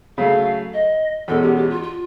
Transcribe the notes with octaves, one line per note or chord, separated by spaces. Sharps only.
C#3 F#3 A3 F5
D#5
E2 B2 G#3 C#4 A4
G4
G4
F4
F4